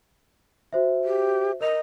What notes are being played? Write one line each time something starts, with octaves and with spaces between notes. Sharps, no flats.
F#4 C5 E5
G4
A#4 D#5 F7